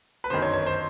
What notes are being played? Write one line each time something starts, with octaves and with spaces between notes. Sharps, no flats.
B4
G1 F#2 D#3 C5
C#5
C#5
C5